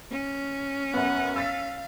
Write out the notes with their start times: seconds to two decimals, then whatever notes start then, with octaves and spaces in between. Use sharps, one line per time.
0.12 C#4
0.94 F#2 B3 F#5
1.36 F5 E6 A6 B6